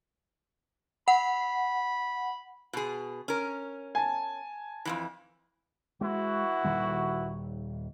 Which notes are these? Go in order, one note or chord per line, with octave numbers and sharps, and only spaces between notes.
F#5 B5
B2 G#4
C#4 A#4
G#5 A5
F2 G#2 E3
E3 G#3 E4 F#4
D#1 D#3 G3